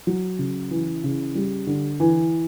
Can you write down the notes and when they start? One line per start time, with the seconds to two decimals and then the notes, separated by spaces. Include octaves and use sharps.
0.07 F#3
0.39 C#3
0.71 E3
1.04 C#3
1.35 G3
1.67 D3
2.00 E3